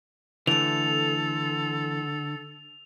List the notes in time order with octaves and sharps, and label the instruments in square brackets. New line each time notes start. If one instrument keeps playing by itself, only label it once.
[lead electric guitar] D3 [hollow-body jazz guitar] E3 A3 [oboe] A4 [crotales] F7